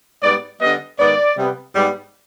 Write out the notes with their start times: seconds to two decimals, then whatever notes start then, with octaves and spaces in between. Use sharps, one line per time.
0.22 G#2 G3 B3 D5
0.60 D3 G3 B3 D#5
0.99 G#2 D#3 B3 D5
1.36 C3 G3 B3
1.73 G#2 G3 B3